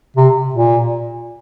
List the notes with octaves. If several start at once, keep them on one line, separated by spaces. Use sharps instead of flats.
C3
A#2